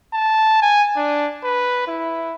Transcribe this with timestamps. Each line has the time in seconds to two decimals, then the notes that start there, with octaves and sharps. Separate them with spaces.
0.13 A5
0.62 G#5
0.96 D4
1.44 B4
1.88 E4